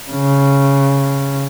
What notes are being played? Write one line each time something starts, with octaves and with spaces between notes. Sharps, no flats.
C#3